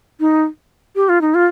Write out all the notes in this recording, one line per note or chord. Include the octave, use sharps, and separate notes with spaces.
D#4
G4
F4
D#4
F4